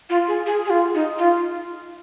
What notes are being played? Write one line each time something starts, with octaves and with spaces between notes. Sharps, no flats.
F4
G#4
G#4
G#4
F4
D#4
F4